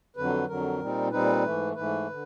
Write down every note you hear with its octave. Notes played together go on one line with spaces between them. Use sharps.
F2 D3 F#3 B4
F2 D3 F#3 A#4
A#2 G3 C4 D#4
A#2 G3 C4 D#4 B4
G#2 E3 A3
G#2 E3 A3 B4
D3